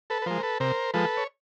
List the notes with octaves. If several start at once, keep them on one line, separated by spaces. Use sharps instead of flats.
A4 B4
B4
F3 G#3 A#4 C5
A4 B4
C3 A#4 C5
F3 G#3 A4 B4
C#5